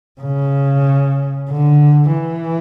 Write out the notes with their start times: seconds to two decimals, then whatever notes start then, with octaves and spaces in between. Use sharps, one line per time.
0.21 C#3
1.50 D3
2.13 E3